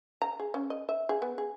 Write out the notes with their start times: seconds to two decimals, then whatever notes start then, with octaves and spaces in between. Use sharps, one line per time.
0.22 A#5
0.40 G#4
0.54 C#4
0.70 D#5
0.89 E5
1.09 G#4
1.22 B3
1.38 G#4